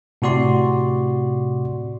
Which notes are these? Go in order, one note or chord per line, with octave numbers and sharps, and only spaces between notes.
A2 C3 F#4 D5 C6